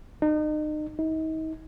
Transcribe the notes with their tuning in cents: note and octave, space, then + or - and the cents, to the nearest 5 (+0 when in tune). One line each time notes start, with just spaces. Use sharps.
D#4 -35
D#4 +35